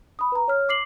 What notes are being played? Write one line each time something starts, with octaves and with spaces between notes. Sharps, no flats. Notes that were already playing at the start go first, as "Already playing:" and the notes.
B5 D#6
B4 A#5
C#5 F6
D6 C7 F#7